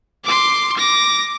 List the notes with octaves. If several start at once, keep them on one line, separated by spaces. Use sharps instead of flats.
C6 D6
D6 A#6